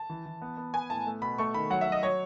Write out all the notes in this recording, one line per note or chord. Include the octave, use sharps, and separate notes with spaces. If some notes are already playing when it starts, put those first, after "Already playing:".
Already playing: A5
E3
E3
B3
B3
B3 G#5
A2 A5
A3
B2 B5
A3 C#6
D#3 B5
F#3 F#5
E5
F#3
D#5
F#3 C#5